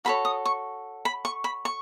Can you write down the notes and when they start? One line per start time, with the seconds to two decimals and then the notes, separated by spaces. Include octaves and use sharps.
0.05 F#4 A4 C#5 B5
0.25 D#6
0.45 C#6
1.05 B5
1.25 C#6
1.44 B5
1.65 C#6